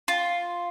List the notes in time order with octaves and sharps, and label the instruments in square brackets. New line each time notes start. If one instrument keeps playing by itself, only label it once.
[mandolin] F4